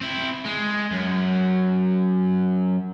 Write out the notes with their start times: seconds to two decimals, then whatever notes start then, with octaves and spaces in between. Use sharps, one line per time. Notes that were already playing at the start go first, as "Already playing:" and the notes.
0.01 C4 E4
0.46 G#3
0.91 F#2